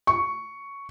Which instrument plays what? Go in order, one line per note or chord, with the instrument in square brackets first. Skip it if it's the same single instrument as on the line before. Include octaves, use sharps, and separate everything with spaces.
[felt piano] C#6